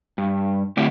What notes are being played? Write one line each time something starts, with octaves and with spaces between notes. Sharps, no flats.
G2
D3 A3 C4 E4 G4